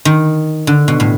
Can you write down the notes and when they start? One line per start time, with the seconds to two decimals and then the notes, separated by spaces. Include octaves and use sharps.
0.05 D#3
0.67 D3
0.88 B2
1.00 A2